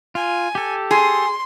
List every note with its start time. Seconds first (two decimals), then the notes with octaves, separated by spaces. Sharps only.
0.15 F4 G#5
0.55 G4 A4
0.91 G#4 C6